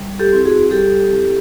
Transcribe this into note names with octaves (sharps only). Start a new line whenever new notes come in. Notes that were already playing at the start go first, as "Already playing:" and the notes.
Already playing: G3
G4 A4
C4 E4
F#4 G#4
G3 G4 A4
C4 E4